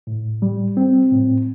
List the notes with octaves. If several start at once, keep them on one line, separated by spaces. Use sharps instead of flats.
A2
G3
C4
A2